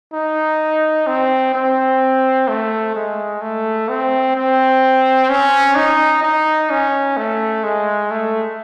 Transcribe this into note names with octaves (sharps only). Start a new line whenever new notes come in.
D#4
C4
C4
A3
G#3
A3
C4
C4
C#4
D#4
D#4
C#4
A3
G#3
A3